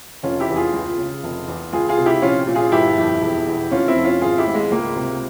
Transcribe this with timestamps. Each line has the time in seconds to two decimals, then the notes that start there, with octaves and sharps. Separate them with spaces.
0.23 F1 C#4 F4
0.40 E4 G4
0.49 E2
0.56 F4 G#4
0.73 C#2
0.98 C#3
1.23 F1
1.48 E2
1.73 C#2 F4 G#4
1.89 F4 G#4
1.97 C3
2.06 E4 G4
2.22 A#1 C#4 F4
2.47 A#2
2.55 F4 G#4
2.72 G1 E4 G4
2.98 F2
3.22 E1
3.46 E2
3.71 F1 C#4 F4
3.88 C4 E4
3.96 F2
4.04 C#4 F4
4.21 G#1 F4 G#4
4.38 E4 G4
4.47 G#2
4.55 G#3
4.71 C#2 A#3
4.96 C3